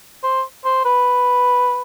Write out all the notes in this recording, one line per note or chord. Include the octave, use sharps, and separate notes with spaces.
C5
C5
B4